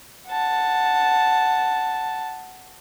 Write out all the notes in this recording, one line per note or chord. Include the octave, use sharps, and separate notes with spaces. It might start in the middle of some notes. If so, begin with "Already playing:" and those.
F#5 A5